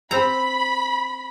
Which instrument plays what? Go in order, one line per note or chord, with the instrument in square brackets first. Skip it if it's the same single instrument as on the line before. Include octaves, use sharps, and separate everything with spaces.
[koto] C4 A#5 [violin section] B5